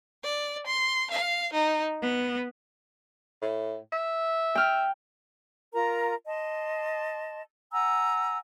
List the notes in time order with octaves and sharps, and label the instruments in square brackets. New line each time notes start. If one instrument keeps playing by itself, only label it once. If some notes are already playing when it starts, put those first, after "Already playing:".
[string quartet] D5
C6
F5
D#4
B3
[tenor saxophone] A2
E5
[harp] G5 F6
[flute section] F4 A#4 A#5
D#5 A5 C6
F#5 G#5 A#5 E6